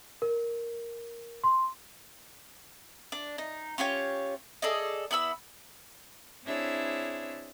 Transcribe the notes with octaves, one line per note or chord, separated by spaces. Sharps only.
A#4
C6
D4
D#4
C#4 F4 G4 C#5
G#4 A4 D5 D#5
B3 E4 B5 E6
C4 D4 E4 G#4 C#5 E5